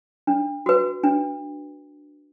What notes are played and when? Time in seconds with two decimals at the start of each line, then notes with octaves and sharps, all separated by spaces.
0.27 D4
0.66 F#4 B4
1.04 D4